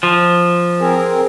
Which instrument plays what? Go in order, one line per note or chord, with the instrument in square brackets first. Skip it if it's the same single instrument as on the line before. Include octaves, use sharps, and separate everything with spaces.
[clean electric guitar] F3
[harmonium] C4 G#4 A#4